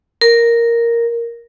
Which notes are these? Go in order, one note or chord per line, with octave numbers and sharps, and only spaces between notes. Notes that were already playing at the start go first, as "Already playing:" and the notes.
A#4